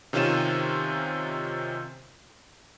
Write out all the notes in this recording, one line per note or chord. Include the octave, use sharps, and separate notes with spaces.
C3 D#3 C#4 F4 D#7 E7